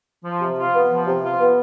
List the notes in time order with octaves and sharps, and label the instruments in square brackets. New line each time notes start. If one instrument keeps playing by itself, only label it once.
[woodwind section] F3
C3
F4
B3
F3
C3
F4
B3